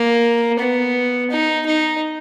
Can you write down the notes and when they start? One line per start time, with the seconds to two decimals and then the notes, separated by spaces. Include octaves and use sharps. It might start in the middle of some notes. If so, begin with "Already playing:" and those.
Already playing: A#3
0.59 B3
1.31 D#4
1.66 D#4